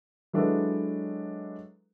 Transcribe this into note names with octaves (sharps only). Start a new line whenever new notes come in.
F#3 G#3 D4 E4 A4 B4